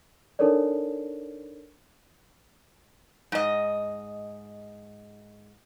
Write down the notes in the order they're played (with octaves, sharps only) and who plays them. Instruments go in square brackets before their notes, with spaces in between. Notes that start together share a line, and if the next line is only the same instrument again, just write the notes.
[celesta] D4 D#4 A4 A#4 C#5 D5
[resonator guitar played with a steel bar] G#2 D#5